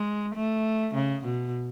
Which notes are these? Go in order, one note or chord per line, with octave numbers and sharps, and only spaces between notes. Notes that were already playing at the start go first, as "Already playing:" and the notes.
Already playing: G#3
A3
C#3
B2